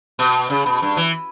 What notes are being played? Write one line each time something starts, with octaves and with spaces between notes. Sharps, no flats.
B2
C#3
B2
G2
E3